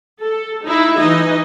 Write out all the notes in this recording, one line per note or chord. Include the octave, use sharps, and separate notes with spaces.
A4
D#4 E4
E3 D#4 D#5